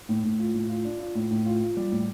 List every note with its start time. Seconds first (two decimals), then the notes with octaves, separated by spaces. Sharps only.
0.09 A2
0.24 A2
0.39 F4
0.54 A2
0.70 F4
0.85 D4
1.00 F4
1.15 A2
1.31 A2
1.46 F4
1.61 F4
1.77 G3
1.92 A2